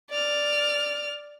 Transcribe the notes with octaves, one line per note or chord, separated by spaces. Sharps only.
D5 F6